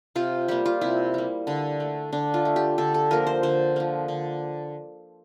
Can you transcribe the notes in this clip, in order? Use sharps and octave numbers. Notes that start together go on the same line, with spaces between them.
C3 F4
G3 A#3 G4
F4
C3 E4
G3 A#3
D3
A3
D3 D4
F4
A3
G4
D3 A4
A4
F3 A#3 A#4
C5
D3 C5
F3 A#3
D3